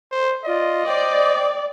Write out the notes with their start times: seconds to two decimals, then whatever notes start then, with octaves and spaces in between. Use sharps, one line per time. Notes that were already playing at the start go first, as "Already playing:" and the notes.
0.11 C5
0.45 F4 D5 D#5
0.86 C5 D5 G5 D#6